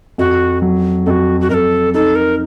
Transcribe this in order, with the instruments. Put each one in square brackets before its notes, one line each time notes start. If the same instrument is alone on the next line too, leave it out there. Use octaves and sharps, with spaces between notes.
[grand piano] F2 [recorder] F#4
[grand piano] F#3
[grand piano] F2 [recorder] F#4 A4
[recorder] F#4
[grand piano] F2 [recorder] A#4
[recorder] A4
[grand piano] D#4 [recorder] A4
[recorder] A#4